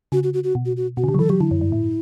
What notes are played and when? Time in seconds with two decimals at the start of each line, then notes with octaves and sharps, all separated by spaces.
0.12 C#3 F#4
0.23 F#4
0.34 F#4
0.44 F#4
0.55 B2
0.65 F#4
0.77 F#4
0.97 B2 F#4
1.04 C#3
1.08 D3 G4
1.14 F#3
1.19 E3 A4
1.29 F#3 G4
1.40 D3 E4
1.51 F#2
1.61 G2
1.72 A2